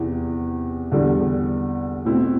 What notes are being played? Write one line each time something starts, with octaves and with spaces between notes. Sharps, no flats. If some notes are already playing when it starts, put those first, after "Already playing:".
Already playing: E2 C3 E3 B3
E2 D3 G3 B3
B2 A3 C4 E4